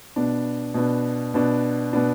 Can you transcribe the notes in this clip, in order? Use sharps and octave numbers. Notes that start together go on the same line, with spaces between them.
B2 B3 D4
B2 B3 D4
B2 B3 D4
B2 B3 D4